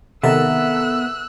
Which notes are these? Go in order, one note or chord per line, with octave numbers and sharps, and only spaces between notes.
C3 D#3 B3 A4 A#4 E5 E6 F#6